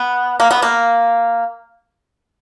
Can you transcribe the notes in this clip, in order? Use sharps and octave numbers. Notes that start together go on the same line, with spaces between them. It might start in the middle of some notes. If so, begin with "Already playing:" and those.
Already playing: B3
A#3
B3
A#3